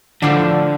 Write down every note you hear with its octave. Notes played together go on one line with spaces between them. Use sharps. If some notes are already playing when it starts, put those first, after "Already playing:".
A2 D3 F3 D4